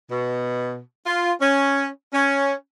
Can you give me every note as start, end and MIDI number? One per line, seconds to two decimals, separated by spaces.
0.10 0.80 47
1.05 1.33 65
1.41 1.87 61
2.14 2.53 61